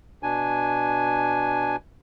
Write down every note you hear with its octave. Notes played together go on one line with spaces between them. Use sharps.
B2 D4 G#5